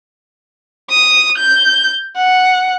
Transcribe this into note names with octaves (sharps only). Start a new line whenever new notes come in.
D#6
G6
F#5